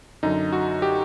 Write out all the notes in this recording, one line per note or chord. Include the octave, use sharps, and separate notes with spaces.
F#2 D3 F#3 D#4
F#4
G4